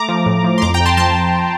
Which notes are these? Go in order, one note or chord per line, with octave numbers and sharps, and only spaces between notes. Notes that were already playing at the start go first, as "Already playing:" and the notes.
Already playing: A3 A#5 D6
F3
A2
F3
C6
F2 A#5 D6
G5 A#5
F2
A5 C6
F3 A5 C6